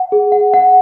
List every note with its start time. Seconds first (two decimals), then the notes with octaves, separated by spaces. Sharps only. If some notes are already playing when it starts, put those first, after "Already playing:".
Already playing: F#5
0.12 G#4
0.32 F#5
0.54 F#5